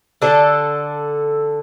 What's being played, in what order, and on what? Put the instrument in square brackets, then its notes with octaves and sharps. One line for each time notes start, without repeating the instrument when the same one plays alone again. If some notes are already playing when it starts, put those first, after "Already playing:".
[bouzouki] D3 D4 A4